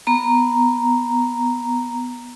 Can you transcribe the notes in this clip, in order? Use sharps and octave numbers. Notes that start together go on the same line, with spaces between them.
B3 A#5